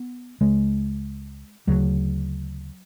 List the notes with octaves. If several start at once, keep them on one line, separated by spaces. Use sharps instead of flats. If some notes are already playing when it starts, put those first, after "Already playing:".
Already playing: B3
C#2 C#3 G#3
D2 C#3 F#3